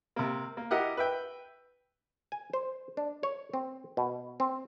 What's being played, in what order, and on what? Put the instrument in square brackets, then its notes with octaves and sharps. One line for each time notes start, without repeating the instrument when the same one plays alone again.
[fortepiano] C3 A#3
A#3
E4 G4 A#4 D#5 F#5
B4 E5 G5
[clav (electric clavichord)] G#5
C5
D4
C#5
C4
B2
C4